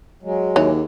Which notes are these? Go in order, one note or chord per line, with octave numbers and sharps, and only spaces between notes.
F#3 G#3
D#2 E3 C#5